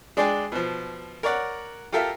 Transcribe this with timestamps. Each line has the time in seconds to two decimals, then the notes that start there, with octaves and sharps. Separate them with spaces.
0.17 G#3 D4 G#4 D5 G5
0.52 B2 F3
1.23 A#4 C#5 D5 F#5
1.92 F4 G4 A4 A#4 E5 F5